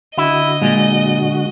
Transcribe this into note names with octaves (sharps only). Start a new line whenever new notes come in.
D3 E4 F#4 D#5
A#2 G#3